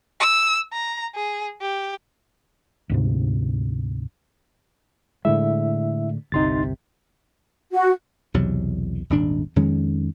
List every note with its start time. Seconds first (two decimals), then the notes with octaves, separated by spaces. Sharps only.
0.20 E6
0.72 A#5
1.15 G#4
1.61 G4
2.90 D2 G#2 C3
5.25 A2 D3 G#3 E4 E5
6.32 G1 C2 C3 D#4 C6 A6
7.74 F#4
8.34 B1 E2 C3 F#3
9.10 D#1 G#1 D4
9.56 F2 D#3 G#3 C#4